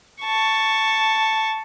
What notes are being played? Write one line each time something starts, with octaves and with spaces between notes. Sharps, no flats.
A5 C#6